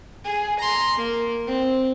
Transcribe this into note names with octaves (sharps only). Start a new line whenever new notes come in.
G#4
A#5 C6
A#3
C4